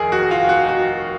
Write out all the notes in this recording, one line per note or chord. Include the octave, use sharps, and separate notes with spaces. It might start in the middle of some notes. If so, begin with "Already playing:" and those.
Already playing: F1 D#2 D#3 G#4 A#4
F#4
F4
F#4
F#4